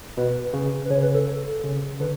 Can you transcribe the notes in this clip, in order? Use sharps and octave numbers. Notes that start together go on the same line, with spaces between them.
B2 B4
C#3
B4
C#3 C#5
B4
A4
C#3
D3 B4